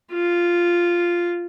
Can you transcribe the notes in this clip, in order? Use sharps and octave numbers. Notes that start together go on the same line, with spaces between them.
F4